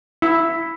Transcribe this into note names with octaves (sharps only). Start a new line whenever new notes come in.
E4